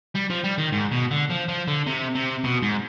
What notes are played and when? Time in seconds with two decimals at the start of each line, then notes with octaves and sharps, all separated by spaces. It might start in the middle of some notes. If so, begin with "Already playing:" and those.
0.15 G3
0.30 F3
0.44 G3
0.58 D#3
0.72 G#2
0.92 B2
1.11 D3
1.30 F3
1.49 F3
1.68 D3
1.86 C3
2.15 C3
2.44 B2
2.62 G#2